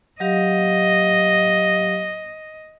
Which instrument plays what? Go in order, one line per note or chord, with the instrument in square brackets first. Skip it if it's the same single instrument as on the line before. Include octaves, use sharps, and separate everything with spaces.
[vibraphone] F#3 G4 F5 [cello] D#5